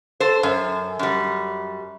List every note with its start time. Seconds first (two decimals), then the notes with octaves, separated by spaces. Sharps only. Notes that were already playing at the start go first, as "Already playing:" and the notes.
0.20 A4 C5
0.43 F#2
0.99 F#2 G3